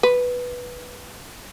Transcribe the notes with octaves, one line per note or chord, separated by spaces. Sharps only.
B4